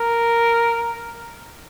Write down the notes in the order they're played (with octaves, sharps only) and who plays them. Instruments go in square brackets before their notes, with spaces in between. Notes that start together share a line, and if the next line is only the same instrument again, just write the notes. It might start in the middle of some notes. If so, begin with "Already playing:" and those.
Already playing: [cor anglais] A#4